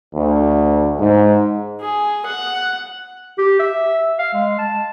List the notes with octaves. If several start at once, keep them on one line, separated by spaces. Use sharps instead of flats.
D2
G#2
G#4
F#5
G4
E5
F5
G#3
A5